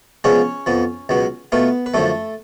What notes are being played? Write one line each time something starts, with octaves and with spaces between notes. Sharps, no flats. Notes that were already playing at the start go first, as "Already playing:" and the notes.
C#3 F3 G#3 B3 C#4 C#5
F2 F3 B3
C#2 B2 F#3 B3
B2 A3 B3 F4 B4
B4
F#2 D3 F3 A3 A4